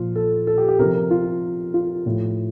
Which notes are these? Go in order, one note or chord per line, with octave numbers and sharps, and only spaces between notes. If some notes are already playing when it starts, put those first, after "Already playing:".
Already playing: A#2 F3 F4
A4
A4
G4
G4
C3 F3 A#4
A#4
F4
F4
A2 F3